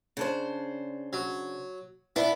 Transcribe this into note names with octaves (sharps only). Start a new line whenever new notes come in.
C#3 D4 C5
F#3
B3 D4 E4